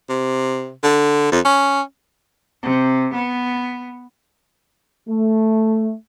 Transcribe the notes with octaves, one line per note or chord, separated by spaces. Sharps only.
C3
D3
F2
C#4
C3
B3
A3